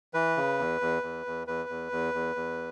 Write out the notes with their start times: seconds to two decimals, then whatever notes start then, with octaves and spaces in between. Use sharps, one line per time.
0.14 E3 B4
0.37 C#3
0.59 E2
0.81 E2
1.03 E2
1.26 E2
1.47 E2 B4
1.69 E2
1.92 E2
2.14 E2
2.36 E2